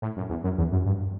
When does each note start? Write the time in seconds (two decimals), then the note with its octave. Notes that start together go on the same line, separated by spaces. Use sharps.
0.02 A2
0.17 F#2
0.30 E2
0.44 F#2
0.58 E2
0.72 F#2
0.86 G2